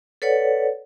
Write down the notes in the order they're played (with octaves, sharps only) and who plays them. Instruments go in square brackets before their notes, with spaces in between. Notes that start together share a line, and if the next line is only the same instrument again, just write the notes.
[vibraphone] A4 B4 C#5 D5 F#5